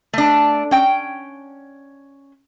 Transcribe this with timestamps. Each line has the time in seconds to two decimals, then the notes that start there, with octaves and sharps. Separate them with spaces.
0.13 A3 D4
0.71 C#4 G5